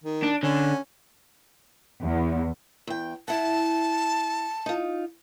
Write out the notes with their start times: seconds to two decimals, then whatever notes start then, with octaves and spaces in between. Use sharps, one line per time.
0.04 D#3
0.23 D4
0.43 D3 C#4
2.02 E2
2.87 E2 G5
3.28 E4 F#5 A5
4.66 D#4 F4